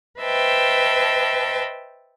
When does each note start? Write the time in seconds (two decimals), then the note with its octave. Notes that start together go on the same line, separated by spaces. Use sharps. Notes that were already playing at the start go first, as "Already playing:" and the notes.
0.20 B4 C5 D#5 E5 G5 A5